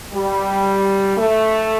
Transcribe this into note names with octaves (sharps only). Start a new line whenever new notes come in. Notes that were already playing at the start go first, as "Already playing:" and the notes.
G3
A3